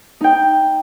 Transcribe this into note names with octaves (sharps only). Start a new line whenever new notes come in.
D#4 G5